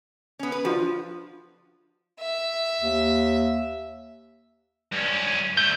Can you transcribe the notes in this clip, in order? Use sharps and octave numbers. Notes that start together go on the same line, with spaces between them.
B3 C#4
B4
F3 D4 F4 F#4
E5
D#2
G2 C#4
D2 A3 G6